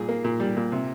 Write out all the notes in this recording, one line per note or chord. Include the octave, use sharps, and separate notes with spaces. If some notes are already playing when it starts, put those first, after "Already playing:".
Already playing: A#2 G3 G#4
A#3
A#2
G3
A#2
C3